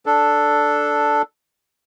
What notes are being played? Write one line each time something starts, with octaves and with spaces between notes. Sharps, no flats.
D4 A4